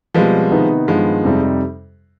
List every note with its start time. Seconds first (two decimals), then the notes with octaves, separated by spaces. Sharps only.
0.14 B2 F3 G3 G#3 C4 G4 B4
0.51 C3 D#3 B3 D#4 B4
0.87 G2 D#3 F3 G#3 B3
1.24 F2 C3 G3 C4 D#4